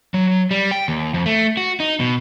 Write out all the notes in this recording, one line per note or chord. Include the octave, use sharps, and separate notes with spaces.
F#3
G3
G5
D#2
F2
A3
F#4
D#4
B2